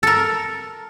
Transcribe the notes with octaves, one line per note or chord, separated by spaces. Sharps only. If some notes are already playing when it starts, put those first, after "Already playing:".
A4 A#4